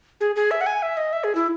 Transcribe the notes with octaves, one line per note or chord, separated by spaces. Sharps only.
G#4
G#4
E5
F#5
G#5
E5
D#5
E5
G#4
E4